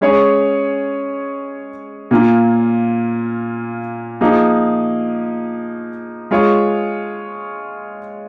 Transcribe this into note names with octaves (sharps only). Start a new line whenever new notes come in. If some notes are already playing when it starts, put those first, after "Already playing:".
G#3 C#4 G#4 C#5
A#2 A#3 F4
F3 A#3 D#4 G#4
G#3 F4 G#4 C#5